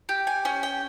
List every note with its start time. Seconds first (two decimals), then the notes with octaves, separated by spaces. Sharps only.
0.09 G4
0.27 G#5
0.45 C#4 G#5
0.63 G5